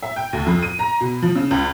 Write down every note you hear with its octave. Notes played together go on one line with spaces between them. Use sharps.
E5
G5
D2
F2
D#7
A#5
B2
F3
C#3
C#2